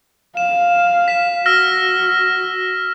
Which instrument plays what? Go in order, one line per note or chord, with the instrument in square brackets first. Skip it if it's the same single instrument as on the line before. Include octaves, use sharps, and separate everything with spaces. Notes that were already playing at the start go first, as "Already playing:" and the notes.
[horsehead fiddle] F5 [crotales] E7
[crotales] B6 E7
[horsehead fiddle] F#4 [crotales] E6 F6 A#6